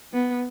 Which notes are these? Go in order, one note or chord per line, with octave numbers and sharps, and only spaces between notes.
B3